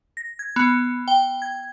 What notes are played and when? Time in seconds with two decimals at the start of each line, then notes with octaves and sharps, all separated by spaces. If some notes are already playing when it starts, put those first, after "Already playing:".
0.17 A#6
0.39 G#6
0.56 B3
1.08 G5
1.42 G#6